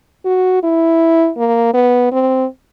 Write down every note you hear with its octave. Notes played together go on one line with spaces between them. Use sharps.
F#4
E4
A#3
B3
C4